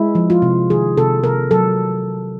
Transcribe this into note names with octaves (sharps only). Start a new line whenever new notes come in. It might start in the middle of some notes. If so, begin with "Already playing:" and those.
Already playing: G#3 E4
F3
F4
C3
D#3 G#4
C3 A4
C3 A#4
F#3 A4